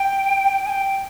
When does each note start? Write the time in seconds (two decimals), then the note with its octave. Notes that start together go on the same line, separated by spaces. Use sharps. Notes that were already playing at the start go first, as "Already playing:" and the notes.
Already playing: G5
0.66 G#5
0.70 G5